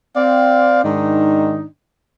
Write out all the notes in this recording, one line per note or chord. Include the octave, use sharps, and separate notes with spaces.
C4 D5 F5
G#2 D#3 D4 D#4